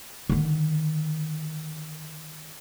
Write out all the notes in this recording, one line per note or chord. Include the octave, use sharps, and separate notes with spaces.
D3 D#3